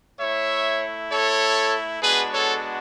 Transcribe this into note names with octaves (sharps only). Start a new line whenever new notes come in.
A3 E4 C#5 E5
A4 C#5
G#3 B3 D4 F#4 G#4 B4
A4 C#5